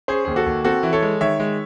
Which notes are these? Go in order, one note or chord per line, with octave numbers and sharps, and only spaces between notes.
C#4 G#4 C5
D#2 G#4
F#4 A4
D#2
C4 F#4 A4
E3
A4 C#5
G#3
D#3 C#5 E5
G#3